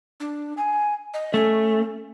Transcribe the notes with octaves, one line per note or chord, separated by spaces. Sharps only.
D4
G#5
D#5
A3 C#4